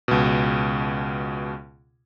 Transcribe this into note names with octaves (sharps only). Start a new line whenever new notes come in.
C#2 B2